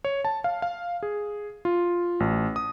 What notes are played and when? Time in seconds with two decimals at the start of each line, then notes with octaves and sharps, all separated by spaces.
0.05 C#5
0.25 A5
0.44 F5
0.62 F5
1.03 G#4
1.65 F4
2.20 A1
2.56 D#6